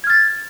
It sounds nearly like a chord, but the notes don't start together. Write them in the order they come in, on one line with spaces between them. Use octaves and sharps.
G#6 F6 A6